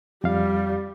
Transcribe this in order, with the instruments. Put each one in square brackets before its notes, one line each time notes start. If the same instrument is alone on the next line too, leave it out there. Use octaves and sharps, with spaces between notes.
[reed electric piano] F2 F5 [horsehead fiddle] G3